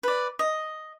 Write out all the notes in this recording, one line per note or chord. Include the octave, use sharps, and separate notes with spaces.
B4 D5
D#5